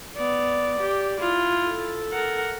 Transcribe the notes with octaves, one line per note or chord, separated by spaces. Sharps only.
B3 D5
G4
E4 F4
A4
A#4 F#5